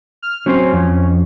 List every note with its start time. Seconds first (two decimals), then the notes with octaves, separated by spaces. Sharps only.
0.22 F6
0.46 F#3 C4 C#4 C5
0.73 F2